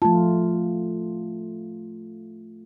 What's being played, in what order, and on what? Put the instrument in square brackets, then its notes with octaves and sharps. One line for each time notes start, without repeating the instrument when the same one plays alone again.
[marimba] F3 A5 [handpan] A3 F4